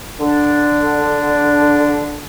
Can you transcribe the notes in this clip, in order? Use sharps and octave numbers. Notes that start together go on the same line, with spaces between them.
D3 D4